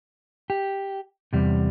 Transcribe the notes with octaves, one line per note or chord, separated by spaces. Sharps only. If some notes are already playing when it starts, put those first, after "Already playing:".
G4
E2 C3 G3